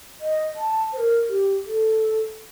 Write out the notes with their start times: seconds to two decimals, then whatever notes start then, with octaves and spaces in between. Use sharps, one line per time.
0.20 D#5
0.56 A5
0.93 C5
0.97 A#4
1.29 G4
1.66 A4